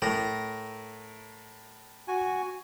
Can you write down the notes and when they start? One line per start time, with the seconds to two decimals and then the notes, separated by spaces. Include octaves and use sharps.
0.02 A2 A#4 A#5
2.08 F#4 G#5